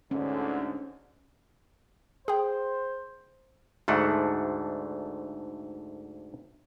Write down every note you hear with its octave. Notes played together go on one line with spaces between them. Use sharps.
D2 G#2 D3 C#4
G#4 C5 G5
D2 G#2 A3 D4 F#5